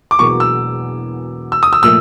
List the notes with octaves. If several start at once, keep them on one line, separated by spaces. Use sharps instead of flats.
D6
E1 E2 B2 F#3 A#3 C#6
E6
E6
D#6
E6
A#2 F3 A3 E6